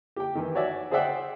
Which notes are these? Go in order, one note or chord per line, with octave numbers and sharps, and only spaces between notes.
G4 G5
D#3 E3
F#4 C#5 D5 E5 G#5
G#4 C5 D5 E5 F#5 G5